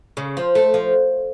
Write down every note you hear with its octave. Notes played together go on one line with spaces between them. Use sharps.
C#3
F3
A3
F3